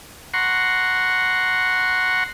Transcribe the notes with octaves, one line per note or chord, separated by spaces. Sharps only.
F#5 A#5 C6 C#6